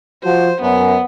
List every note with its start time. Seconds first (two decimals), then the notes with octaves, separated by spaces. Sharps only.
0.24 F3 F#4 C5
0.62 F#2 B3